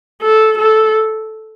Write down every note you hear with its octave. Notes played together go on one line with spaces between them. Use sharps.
A4
A4